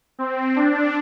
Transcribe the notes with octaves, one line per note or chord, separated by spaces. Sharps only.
C4
D4